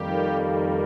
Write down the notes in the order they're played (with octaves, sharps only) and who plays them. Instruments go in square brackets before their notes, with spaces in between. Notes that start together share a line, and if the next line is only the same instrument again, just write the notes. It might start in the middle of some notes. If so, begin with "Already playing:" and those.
Already playing: [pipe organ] F2 D#3 G3 A#3 G4